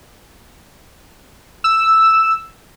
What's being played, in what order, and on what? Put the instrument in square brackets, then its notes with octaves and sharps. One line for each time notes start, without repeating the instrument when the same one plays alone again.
[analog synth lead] E6